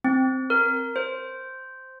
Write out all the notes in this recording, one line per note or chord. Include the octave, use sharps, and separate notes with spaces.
C4
A#4
C5